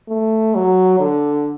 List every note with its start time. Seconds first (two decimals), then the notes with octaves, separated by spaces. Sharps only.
0.08 A3
0.55 F#3
1.00 D3